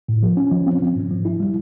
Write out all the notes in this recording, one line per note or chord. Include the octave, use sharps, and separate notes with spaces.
A2
F3
C#4
F3
C4
F3
G#2
F3
E4
G3